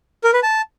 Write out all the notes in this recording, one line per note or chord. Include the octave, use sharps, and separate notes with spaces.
A#4
B4
A5